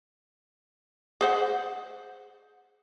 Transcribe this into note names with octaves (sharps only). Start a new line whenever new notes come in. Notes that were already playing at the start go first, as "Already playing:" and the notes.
G#4 C5 F#5